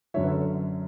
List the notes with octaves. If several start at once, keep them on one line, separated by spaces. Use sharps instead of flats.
F#2 D3 F#3 C#5 E5
B4
A4 C#5